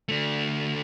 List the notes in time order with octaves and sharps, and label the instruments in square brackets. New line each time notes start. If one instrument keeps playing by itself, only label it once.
[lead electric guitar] D3 A3